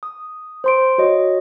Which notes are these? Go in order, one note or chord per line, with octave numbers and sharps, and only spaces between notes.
D#6
C5 C6 D7
F#4 C#5 D#5